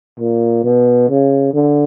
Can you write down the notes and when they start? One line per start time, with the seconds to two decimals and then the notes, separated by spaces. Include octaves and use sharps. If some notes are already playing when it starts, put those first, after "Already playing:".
0.19 A#2
0.64 B2
1.09 C#3
1.54 D3